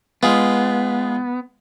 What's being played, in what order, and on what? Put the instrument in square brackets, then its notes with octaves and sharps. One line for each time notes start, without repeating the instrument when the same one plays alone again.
[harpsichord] G#3 F4 [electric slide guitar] B3